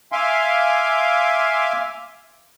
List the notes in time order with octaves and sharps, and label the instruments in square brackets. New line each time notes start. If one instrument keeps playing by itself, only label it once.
[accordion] E5 F5 G#5 C6 D6